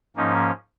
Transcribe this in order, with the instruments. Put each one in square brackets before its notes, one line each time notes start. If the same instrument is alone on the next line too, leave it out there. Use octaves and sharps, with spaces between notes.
[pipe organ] G#2 F3 A#3 C#4 D#4